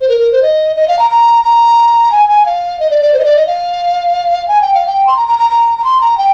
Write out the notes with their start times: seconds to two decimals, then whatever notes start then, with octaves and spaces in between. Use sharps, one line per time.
0.01 C5
0.09 A#4
0.20 A#4
0.32 C5
0.43 D#5
0.76 D#5
0.88 F5
0.99 A#5
1.11 A#5
1.44 A#5
2.12 G#5
2.29 G#5
2.46 F5
2.80 D#5
2.91 D5
3.02 D5
3.14 C5
3.19 D#5
3.25 D5
3.36 D#5
3.47 F5
4.48 G#5
4.61 G5
4.74 F5
4.87 G5
5.07 C6
5.17 A#5
5.28 A#5
5.39 A#5
5.50 A#5
5.78 A#5
5.84 C6
6.01 A#5
6.18 G5